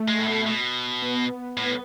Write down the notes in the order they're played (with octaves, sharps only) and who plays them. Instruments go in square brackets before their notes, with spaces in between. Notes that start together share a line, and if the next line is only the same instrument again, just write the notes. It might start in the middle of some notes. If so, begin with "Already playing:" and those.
Already playing: [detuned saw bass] A3
[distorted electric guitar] G#3
A2
B2
B2
[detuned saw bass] B3
[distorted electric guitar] A2